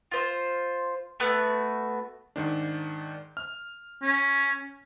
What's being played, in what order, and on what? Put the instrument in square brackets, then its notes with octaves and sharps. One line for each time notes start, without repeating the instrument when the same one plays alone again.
[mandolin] F4 C5
A3 B3 F#4
[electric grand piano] G#2 D#3 D4
F6
[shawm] C#4